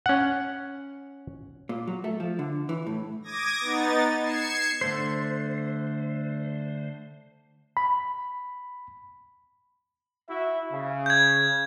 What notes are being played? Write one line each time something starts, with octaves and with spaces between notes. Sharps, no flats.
C#4 F#5
A#2
F#3
A3
F3
D3
E3
A2
D6 D#6 G#6 A#6
B3 D#4 A6
G#6 C7 C#7 E7
D3 A3 C5
B5
E4 F#4 E5
C#3
G6 G#6